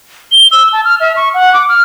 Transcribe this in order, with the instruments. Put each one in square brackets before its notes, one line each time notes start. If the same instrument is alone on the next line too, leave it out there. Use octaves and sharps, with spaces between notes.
[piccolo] G7
E6
A5
F6
E5
C#6
F#5
D6
F6